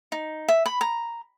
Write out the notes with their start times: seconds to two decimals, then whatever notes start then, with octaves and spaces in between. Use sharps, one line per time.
0.12 D#4
0.48 E5
0.66 B5
0.81 A#5